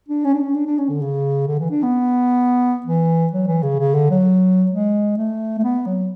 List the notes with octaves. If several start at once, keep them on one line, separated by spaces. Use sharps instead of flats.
D4
C#4
D4
C#4
D4
D4
C#4
D3
C#3
D3
E3
D4
B3
E3
F#3
E3
C#3
C#3
D3
F#3
G#3
A3
A3
B3
F#3